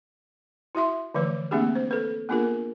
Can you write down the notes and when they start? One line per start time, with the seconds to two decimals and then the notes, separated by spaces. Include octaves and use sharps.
0.75 E4 F#4 E5 C6
1.15 D3 E3 F3 A3 B4
1.51 A3 A#3 C4 D4 G4 G#4
1.76 C5
1.91 A4 B4
2.29 A#3 B3 D4 F4 G#4 A#4